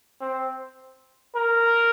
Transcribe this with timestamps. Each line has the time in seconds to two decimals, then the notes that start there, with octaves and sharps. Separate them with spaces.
0.21 C4
1.35 A#4